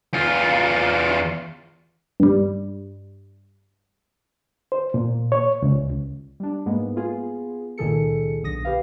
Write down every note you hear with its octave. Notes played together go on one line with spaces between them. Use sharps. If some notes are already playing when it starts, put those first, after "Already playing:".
E2 F4
G2 G3
C5
A#2
C#5
C#2
G3 D4
G#2 G#3 A#3 B3
B3 F4 G#4
C#2 A#2 D#3 G#4 A4 C#7
B1 D3 D#6 A#6
G4 B4 F5